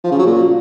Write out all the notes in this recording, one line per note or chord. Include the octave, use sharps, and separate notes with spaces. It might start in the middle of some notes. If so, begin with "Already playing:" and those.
F3
C#3
F#3
A#2